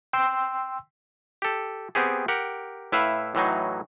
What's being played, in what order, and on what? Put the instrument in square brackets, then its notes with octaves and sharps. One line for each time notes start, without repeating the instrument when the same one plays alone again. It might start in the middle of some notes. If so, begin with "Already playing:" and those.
[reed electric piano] G5 C6 E6
[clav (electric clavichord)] G4 A4
B3 C4 G4 G#4
G4 A#4 F#5
A2 E4 B4 E5 F5
A2 E3 F#3 D#4